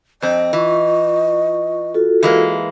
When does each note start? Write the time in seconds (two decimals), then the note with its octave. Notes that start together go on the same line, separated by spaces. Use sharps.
0.22 F2 C4 D#5
0.53 E3 F4 C#6
1.94 F4 F#4 A4
2.23 E3 G#3 A#3